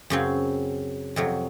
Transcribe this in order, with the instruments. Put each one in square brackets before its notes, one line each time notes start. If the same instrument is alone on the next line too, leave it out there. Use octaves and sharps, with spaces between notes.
[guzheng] F#2 C#3 F#3 C4
F2 C3 F#3